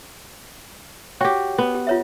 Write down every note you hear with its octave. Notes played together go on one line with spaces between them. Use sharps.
F#4 G4 C#5 G5
B3
G4
F4 C#5 E5